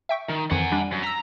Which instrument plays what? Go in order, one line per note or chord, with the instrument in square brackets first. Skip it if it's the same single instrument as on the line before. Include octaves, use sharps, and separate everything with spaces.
[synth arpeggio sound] E5 G5 C#6
[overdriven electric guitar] D#3
[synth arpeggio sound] F2 D#3 E3 [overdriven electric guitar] F#5 G#5
[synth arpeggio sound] G3 D4
[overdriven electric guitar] F#2
[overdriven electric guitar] A#5 [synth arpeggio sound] E6 B6